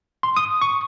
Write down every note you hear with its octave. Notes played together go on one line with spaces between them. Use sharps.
C6
D#6
C#6